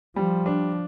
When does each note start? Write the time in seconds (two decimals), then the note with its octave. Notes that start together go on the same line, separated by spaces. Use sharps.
0.16 F3 G3
0.46 D4